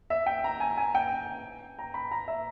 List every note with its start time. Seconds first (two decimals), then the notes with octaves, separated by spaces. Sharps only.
0.10 E5
0.26 G5
0.44 A#5
0.60 G#5
0.77 G#5
0.95 G5
1.79 A#5
1.94 B5
2.11 A#5
2.28 E5